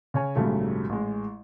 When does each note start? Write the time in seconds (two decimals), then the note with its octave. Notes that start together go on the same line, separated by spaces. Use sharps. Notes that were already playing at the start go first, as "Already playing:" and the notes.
0.14 C#3 C#5 G#5
0.35 A#1 G#2 C#3 F#3 G3 A3
0.89 A1 G#3